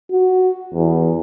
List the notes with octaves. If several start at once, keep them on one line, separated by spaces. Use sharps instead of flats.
F#4
E2